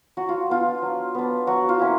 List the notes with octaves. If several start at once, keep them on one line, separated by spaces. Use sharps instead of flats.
F#3 F#4
F4
B3 D4 F4
F#3
B3 D4
F#3 F#4
F4
A#3 C#4 E4